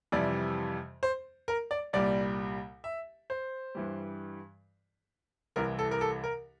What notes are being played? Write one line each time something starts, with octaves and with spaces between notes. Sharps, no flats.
F2 C3 E3 G3 D5
C5
A#4
D5
C2 A#2 G3 D5
E5
C5
G2 E3 G3
C2 C3 E3 A#4
A4
A#4
A4
A#4